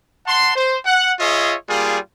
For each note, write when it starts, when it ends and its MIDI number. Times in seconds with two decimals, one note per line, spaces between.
0.27 0.55 78
0.27 0.55 81
0.27 0.55 84
0.55 0.78 72
0.86 1.13 78
1.20 1.55 65
1.20 1.55 68
1.20 1.55 73
1.20 1.55 75
1.20 1.55 76
1.69 1.99 55
1.69 1.99 58
1.69 1.99 65
1.69 1.99 68